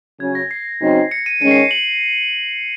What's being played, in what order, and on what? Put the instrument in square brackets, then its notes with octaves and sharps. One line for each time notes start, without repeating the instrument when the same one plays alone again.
[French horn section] C#3 F#3 C#4 [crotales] G#6
[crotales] A#6
C7
[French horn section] C#3 F#3 C4 D#4
[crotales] C#7
D#7
[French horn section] D#3 G#3 C#4 [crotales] D#7
[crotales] C7
F#7